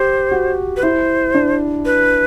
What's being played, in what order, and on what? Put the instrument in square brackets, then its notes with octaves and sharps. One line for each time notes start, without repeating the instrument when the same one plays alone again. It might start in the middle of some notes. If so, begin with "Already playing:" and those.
Already playing: [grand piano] G4 [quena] C5
[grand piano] F#4
[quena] B4
[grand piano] E4 [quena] C5
[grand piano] D4
[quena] B4